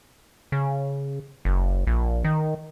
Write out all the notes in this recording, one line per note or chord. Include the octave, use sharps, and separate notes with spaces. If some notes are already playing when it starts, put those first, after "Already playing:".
C#3
F#1
A#1
D#3